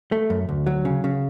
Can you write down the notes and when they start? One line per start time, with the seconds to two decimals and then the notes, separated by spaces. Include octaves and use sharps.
0.12 A3
0.30 F#2
0.49 D2
0.67 F#3
0.85 C#3
1.04 C#3